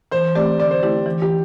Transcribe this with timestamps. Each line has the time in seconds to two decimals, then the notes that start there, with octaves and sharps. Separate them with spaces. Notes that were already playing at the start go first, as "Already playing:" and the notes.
0.12 E3 C5
0.35 A3 C4 G4 D5
0.58 D3 D5
0.71 C5
0.83 A3 E4 G4
1.06 E3
1.22 G4